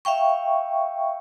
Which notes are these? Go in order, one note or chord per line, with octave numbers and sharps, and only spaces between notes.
E5 F5 G5 C#6